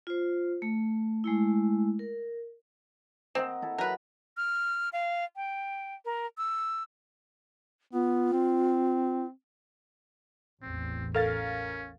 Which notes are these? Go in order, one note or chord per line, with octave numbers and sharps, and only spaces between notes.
F4 C5
A3
G#3 A3 E4
A#4
C4 A#4 D#5 F#5
E4 A4
F#3 A#4 B4
F6
F5
G5
A#4
E6
B3 F4
C4
A1 E2 C4
C#4 A4 A#4 F5 A6